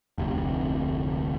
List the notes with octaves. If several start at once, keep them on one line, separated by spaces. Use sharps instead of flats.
F1 D2 C3